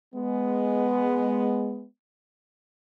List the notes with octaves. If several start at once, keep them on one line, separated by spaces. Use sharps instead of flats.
G#3 B3